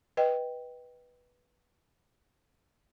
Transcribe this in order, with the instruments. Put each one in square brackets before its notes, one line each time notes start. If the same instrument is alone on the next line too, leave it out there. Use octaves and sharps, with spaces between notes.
[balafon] B4 D#5 G5